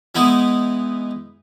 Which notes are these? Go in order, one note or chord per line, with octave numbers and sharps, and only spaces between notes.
E3 G#3 B3 D#4 E4